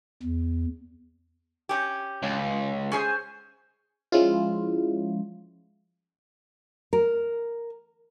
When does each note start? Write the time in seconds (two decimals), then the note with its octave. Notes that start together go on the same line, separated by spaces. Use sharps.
0.23 E2
1.69 C#4 G4
2.23 C#2
2.92 C#4 G#4 C5
4.12 F3 G#3 C#4 E4 F4
6.93 A#4